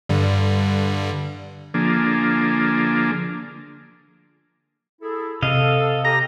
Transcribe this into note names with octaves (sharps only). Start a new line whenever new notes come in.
G2 D3 G3
D3 F3 A#3 D4 G#4
E4 G#4 A4
C3 A4 D#5 F5
G4 A#5